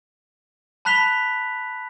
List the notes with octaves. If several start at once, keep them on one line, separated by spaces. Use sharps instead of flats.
A5 B5 F#6 B6 F7 G7